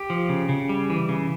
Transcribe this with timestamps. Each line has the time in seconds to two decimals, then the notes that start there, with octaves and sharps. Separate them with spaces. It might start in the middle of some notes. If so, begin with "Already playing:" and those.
Already playing: G4
0.10 F3
0.29 C#3
0.49 C#3
0.69 G3
0.90 E3
1.09 C#3